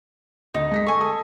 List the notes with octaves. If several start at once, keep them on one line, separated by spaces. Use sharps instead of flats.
D2 D#4
G#3 A#6 B6
A4 G#5 C#6
A4 D#6